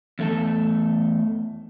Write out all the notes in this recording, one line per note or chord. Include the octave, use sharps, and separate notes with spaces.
E2 A3 A4